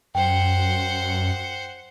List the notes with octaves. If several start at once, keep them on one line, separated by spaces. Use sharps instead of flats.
F#2 C5 F#5 G5